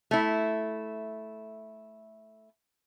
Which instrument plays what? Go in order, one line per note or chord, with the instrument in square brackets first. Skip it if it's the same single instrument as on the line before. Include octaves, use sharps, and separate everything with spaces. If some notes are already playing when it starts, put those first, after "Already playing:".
[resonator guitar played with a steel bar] A3 E4